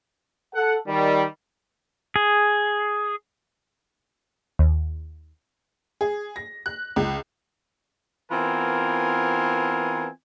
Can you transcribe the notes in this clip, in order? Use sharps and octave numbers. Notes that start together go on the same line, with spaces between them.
A4 F#5
D#3 G3
G#4
D#2
G#4
A#6
F#6
C#2
E3 B3 C4 F4 A#4 G#5